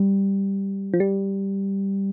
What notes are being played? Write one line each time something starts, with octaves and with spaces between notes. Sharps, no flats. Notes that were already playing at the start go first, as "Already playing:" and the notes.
Already playing: G3
F3
G3